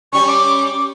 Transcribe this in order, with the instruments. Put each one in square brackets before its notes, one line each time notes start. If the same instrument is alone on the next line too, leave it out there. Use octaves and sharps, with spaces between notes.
[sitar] G3 C#4 [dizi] C#6
[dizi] D6